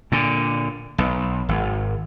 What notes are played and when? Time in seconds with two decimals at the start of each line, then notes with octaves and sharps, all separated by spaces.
0.12 A#2 D3
0.98 B1
1.49 G#1